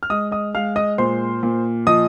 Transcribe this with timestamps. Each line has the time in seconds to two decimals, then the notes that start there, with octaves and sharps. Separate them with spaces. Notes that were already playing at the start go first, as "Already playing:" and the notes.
0.03 F6
0.10 G#3 D#5 D#6
0.32 D#5 D#6
0.55 G#3 F5 F6
0.76 D#5 D#6
0.98 A#2 C5 C6
1.43 A#2
1.87 F3 D#5 D#6